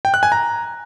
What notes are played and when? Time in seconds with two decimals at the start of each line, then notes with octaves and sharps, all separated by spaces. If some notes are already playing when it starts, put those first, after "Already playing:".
0.05 G5
0.14 F#6
0.23 G#5
0.32 A#5